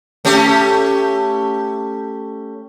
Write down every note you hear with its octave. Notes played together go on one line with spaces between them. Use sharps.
A3 C#4 G4